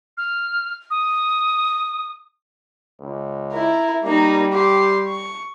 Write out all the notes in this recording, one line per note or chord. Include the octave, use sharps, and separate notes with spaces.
F6
D#6
C#2
E4 A#4
G3 A#3 D#4
G4 C6
C#6